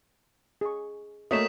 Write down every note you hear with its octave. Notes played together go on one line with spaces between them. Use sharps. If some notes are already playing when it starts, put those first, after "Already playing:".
G#4 C#6
A3 A#3 F#4 C#5 D#5 D#6 B6 E7